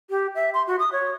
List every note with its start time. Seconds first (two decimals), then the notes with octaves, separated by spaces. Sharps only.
0.10 G4
0.35 E5
0.54 C6
0.67 F#4
0.79 D#6
0.92 C#5